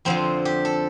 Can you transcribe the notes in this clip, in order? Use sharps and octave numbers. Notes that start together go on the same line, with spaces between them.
F2 D3 F3 C4
G4
A4